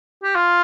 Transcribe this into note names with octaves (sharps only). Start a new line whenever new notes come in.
G4
F4